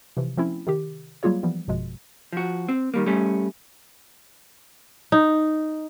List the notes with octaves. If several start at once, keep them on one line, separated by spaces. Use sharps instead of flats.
C3 E3 F3
F3 A3 C4 C#4 E4
C3 D#3 G4
F#3 G3 A#3 F4 G#4 C#5
E3 F3 G3 B3
G#1 F#2 B2 F3 G#3
F3 F#4
C4
D#3 G3 A#3
G3 A3 C#4
D#4